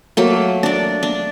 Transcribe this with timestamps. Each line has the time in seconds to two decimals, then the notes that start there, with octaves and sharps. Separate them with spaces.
0.17 F#3 A3 A#3
0.63 D4 D5
1.03 D4